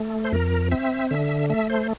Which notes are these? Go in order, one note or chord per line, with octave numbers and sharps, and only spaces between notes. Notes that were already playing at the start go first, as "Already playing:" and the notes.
Already playing: A3
C5
F2 A#4
C4 E5
D3 E5
A3 E5
C5